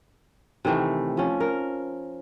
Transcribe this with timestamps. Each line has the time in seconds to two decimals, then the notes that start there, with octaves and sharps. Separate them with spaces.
0.65 C3 D#3 E3 A3
1.17 F3 C#4
1.40 A#4